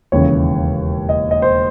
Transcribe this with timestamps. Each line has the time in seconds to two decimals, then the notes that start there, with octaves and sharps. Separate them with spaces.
0.12 E1 D#2 C#3 E3 C#5
1.09 D#5
1.31 D#5
1.42 C5